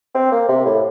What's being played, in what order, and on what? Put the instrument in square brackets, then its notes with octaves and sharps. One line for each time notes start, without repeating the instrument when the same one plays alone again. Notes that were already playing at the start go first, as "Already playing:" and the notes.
[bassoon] C4
A#3
C3
A2